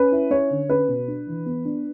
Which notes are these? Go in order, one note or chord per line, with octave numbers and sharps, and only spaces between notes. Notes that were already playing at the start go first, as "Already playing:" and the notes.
Already playing: C#4 B4
E4
C#4 C#5
D3
C#4 B4
B2
D4
E3
B3
D4